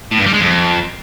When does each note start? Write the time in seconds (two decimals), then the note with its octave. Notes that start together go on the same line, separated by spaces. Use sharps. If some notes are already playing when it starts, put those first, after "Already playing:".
0.12 A2
0.19 G2
0.26 G3
0.33 G#3
0.41 F2